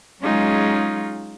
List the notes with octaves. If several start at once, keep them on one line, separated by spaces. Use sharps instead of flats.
F#3 G#3 C#4 D#4 F4 G#4